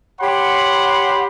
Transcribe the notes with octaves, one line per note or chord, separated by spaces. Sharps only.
G4 C#5 F#5 B5 C6